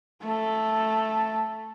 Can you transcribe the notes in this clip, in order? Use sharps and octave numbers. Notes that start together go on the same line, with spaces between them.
A3 A4